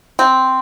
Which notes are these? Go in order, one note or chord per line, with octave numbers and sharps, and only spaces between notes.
C4